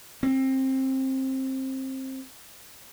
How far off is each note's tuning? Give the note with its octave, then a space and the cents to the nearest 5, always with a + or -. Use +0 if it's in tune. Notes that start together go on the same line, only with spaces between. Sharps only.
C4 +20